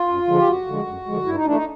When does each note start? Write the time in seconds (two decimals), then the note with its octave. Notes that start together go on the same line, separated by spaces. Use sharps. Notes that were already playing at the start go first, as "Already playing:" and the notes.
Already playing: F4
0.09 F#2
0.28 D3 F3 G#3
0.38 G4
0.47 F#2 F#4
0.67 D3 F3 G#3
0.87 F#2
1.06 D3 F3 G#3
1.26 G2 E4
1.36 D#4
1.45 E3 A3 D4
1.55 D#4